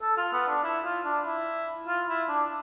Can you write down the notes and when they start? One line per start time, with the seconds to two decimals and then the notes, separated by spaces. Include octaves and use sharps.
0.02 A4
0.17 F4
0.33 B3
0.48 D4
0.63 E4
0.84 F4
1.05 D4
1.26 E4
1.88 F4
2.09 E4
2.29 D4